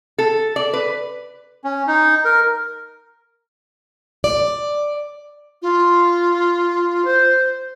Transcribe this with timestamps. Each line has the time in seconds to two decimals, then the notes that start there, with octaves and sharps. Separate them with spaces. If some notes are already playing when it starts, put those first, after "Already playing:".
0.18 A4
0.56 D5
0.73 B4
1.64 C#4
1.87 D#4
2.25 A#4
4.24 D5
5.62 F4
7.05 C5